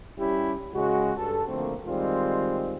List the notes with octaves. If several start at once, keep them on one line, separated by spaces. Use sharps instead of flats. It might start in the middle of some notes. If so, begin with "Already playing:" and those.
G3 C#4 E4 G4
C#3 G#3 F#4
G2 A4
D3 F3 A3 A#3 C4
D#3 G3 G#3 C4 F4